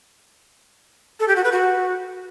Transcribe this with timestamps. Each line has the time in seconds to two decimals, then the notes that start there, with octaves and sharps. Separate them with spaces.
1.20 A4
1.28 G4
1.36 F#4
1.44 B4
1.52 F#4